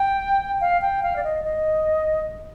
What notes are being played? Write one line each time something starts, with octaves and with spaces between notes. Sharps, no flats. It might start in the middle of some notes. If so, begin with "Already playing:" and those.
Already playing: G5
F5
G5
F5
D5
D#5
D#5